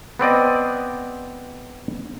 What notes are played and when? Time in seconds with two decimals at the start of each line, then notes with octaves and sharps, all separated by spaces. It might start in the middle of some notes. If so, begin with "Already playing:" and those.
0.19 B3 C4 D5 D#5